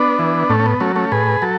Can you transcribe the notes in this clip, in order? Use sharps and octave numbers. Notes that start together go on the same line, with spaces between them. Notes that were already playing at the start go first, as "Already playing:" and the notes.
Already playing: B3 D4
E3
A2 A3 C#4
C#4
B3
F#3 A3 C#4
A3 C#4
A2 G#4 B4
F#3 A4